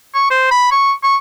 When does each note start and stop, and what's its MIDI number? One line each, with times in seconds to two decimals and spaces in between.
0.14 0.29 85
0.30 0.51 72
0.51 0.70 83
0.71 0.92 85
1.03 1.16 85